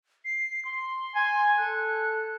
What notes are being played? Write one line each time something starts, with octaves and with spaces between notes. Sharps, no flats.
C7
C6
G#5
A4 F#6